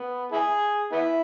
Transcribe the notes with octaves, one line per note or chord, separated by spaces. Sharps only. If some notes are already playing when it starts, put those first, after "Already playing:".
Already playing: B3
E4 G#4
B3 E4